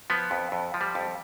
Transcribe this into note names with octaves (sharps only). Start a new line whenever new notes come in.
F3 B3
F2
F2
F3
G3
F2